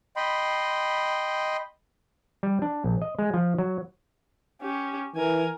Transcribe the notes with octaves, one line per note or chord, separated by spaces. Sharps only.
D#5 G5 B5 C6
G3
D4
A#1
D#5
G#3
F3
F#3
C#4 G4
E3 A#4 G#5